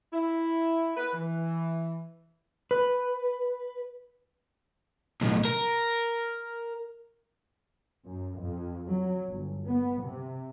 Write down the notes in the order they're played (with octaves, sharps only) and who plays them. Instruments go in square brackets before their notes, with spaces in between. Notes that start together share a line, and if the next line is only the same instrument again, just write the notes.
[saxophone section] E4
B4
E3
[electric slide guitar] B4
[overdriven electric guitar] B1 A2
A#4
[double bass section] F#2
F2
F#3
G1
B3
C3